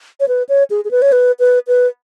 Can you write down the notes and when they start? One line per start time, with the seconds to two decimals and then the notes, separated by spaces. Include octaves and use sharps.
0.20 C#5
0.28 B4
0.49 C#5
0.70 G#4
0.85 G#4
0.91 B4
1.02 C#5
1.12 B4
1.39 B4
1.67 B4